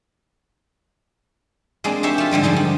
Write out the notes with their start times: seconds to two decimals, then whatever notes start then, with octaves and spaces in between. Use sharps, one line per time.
1.84 G#3 A#3 C4 D4 G#4
2.03 D#4 G4 C5 C#5 E5
2.18 A3 F4
2.31 G#2 D3 G3 G#3
2.43 F#2 D3 F3 D#4 G#4
2.56 G2